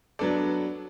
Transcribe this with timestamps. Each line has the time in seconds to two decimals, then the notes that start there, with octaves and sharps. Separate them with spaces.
0.19 F#3 B3 D4 A4 D5